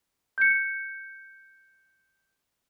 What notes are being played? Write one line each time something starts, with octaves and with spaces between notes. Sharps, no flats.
G6 C#7